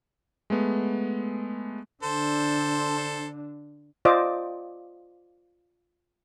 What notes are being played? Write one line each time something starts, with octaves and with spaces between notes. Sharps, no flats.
G#3 A3 B3
D3 D4 A4 C5
F4 C5 D5 D#5 D6